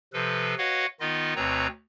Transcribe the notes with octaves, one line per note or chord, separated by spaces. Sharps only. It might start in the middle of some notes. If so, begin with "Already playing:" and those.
C3 F3 A4 B4
F#4 B4 C#5 D#5 F5 F#5
D#3 B3 D#4 F4 D#5
D2 B2 C4 B4 C#5 A#5